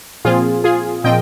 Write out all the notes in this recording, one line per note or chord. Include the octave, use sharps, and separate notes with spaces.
A#2 F3 C4 F4 G#4
F4 G#4
A#2 F3 C4 D#5 G5